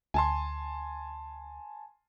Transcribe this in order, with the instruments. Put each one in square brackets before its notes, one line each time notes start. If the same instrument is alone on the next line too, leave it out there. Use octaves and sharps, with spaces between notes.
[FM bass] D2 [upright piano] G#5 A5 C6